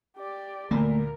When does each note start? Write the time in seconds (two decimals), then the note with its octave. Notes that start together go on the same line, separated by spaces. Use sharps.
0.17 G4 D5
0.71 D2 A#2 A3 A#3 A#4 B5